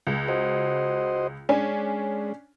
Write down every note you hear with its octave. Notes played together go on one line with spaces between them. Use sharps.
C#2
F#4 C5 D#5
G#3 C#4 D4 G#5